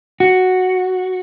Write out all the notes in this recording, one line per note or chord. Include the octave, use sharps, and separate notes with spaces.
F#4